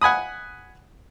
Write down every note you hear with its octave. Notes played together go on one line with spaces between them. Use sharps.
F#5 G#5 B5 D#6